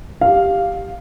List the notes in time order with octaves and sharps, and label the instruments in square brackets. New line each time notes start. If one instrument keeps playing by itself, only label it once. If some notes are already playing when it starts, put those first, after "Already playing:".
[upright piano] G4 F5